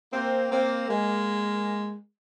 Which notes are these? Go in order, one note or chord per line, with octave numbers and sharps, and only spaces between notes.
A#3 C4
A#3 C4
G#3 A#3